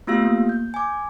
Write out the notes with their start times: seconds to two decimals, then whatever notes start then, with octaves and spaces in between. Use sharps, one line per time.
0.07 A3 B3 F4 G4 F5 E6
0.22 A#3
0.49 G6
0.74 G#5 D6